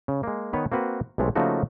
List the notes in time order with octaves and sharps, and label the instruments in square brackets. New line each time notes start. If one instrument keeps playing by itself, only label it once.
[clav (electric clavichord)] C#3
G#3 A#3
D#3 B3 B4 C#5
A#3 C4 F#4 B4
B1 C3 G#3 A3 C#5
C#3 F3 A3 A#3 D#4 F#4